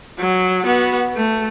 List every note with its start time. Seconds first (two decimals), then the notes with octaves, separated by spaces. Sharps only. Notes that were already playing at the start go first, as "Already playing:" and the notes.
0.19 F#3
0.63 B3 F#4
1.15 A3